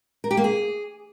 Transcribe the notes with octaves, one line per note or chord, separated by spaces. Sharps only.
A#4
G4
A#3
G#4